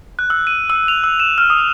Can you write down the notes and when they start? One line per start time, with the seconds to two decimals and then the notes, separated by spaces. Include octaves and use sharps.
0.19 F#6
0.30 E6
0.47 D#7
0.70 E6
0.88 F7
1.04 E6
1.20 E7
1.38 F6
1.50 D#6